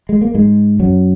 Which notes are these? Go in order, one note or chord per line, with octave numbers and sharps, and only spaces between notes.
G#3
A#3
G#2 G#3
F#2 F#3